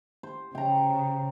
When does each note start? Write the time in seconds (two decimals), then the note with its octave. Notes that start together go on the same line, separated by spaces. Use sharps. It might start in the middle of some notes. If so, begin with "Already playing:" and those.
0.23 C5
0.55 C#3 G5 A#5